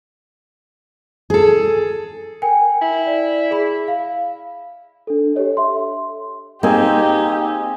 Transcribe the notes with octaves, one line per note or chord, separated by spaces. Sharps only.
G#4 A4
A#4 G5 G#5
E4
D5
G#4 B5
F5
D4 A4
G4 A4 C#5 D#5
E5 C6
A#3 C4 D#4 G4 G#4